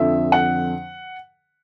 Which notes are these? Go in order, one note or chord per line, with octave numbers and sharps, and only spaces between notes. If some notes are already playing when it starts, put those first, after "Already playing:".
Already playing: F2 D3 F3 E5
F#5